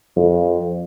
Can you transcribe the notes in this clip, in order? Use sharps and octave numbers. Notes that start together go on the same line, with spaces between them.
F2